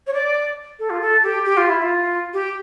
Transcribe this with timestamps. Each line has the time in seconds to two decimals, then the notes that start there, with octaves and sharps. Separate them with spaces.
0.07 C#5
0.13 D5
0.79 A4
0.89 F4
1.01 A4
1.23 G4
1.45 G4
1.57 F4
1.69 E4
1.81 F4
2.33 G4